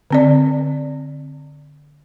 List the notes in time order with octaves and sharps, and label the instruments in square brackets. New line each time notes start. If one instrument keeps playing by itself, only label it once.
[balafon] D3 C4 D5